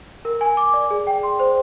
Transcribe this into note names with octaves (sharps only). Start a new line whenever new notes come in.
A#4
G#5
D6
D5
G#4
G5
C6
C5